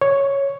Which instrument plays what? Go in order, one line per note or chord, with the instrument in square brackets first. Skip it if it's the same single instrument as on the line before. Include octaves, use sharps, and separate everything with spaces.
[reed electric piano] C#5